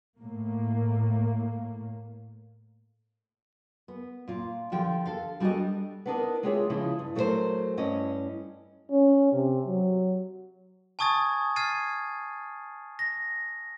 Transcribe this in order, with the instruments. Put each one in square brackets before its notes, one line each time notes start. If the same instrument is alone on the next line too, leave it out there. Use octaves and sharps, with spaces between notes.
[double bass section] A2 A#3
[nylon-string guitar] B3
A#2 F4
D3 F3 G4 G5
A4 F5
G3 D4 F#4 G#4 A4 D#5
B3 D4 D#4 A#4
G#3 F4 G4 G#4 C#5 E5
C#3 F3 G#3 D#4 E4
G2
F#3 A3 B3 E4 A#4 C5
G2 C#4 E4 C#5 D#5
[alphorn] C#4
C3
F#3
[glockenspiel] G#5 A5 C#6 D#6 G#6 A6
F6 G#6 A6 C7 D#7
A#6